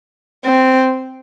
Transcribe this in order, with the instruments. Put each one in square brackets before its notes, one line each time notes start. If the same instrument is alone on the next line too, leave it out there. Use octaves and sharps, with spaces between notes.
[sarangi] C4